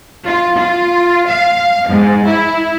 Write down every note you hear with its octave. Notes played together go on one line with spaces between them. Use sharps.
F4
F4
F5
G#2
E4